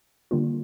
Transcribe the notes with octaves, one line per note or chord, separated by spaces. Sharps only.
D3 G3 A#3 F4